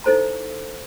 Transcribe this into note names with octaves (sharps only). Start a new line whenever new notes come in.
D#4 E4 A4 C5 A5 A#5